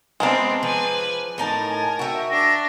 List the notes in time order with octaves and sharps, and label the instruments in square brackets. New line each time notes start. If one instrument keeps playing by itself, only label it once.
[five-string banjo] G#3 D4 [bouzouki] B3 A#4 F#5 [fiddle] C4
[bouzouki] F3 [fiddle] B4 G#5
[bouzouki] A2 D#4 A5 [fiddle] A#4
[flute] G#5
[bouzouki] F#4 E5 [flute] G5
[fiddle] D4 [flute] A#6